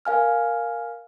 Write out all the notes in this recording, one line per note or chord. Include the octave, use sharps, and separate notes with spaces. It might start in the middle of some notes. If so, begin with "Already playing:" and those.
A#4 F5 G#5 F6